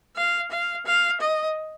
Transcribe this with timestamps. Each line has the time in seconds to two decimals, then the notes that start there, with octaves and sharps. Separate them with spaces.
0.16 F5
0.51 F5
0.86 F5
1.21 D#5